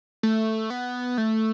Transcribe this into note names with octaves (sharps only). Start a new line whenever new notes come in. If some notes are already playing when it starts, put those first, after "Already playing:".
A3
B3
A3